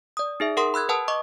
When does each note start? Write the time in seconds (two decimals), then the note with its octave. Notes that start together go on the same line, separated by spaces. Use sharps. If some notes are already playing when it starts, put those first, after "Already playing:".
0.17 D5 D#6
0.40 D#4 G#4 E5
0.57 G#4 A#4 F#5 C6 D#6
0.74 B5 E6 F#6 G#6
0.89 B4 F#5 A5 D#6
1.08 D#5 C#6 D6